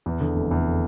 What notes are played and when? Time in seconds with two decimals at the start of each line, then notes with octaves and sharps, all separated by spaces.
0.06 E2
0.20 D3
0.36 F1
0.51 E2